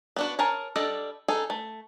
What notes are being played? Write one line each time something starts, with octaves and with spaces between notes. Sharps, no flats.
B3 D4 F#4
G#4 A#4 C#5 A5
G3 D4 A4 D5 D#5
D#4 G#4 A4
A3